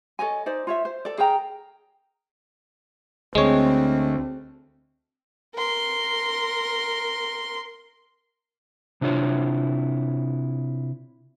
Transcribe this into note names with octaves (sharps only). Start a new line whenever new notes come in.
A4 C#5 D#5 G#5
D#4 C5 D5
F4 C#5 E5
C5
A4 D5
G#4 A#4 G5 A#5
D2 G#3 C4 C#5
A#4 C6
C3 D4 E4 F4 C#5